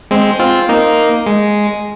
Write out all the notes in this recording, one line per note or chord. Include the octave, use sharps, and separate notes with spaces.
G#3 C4
C4 F4
A#3 D#4
G#3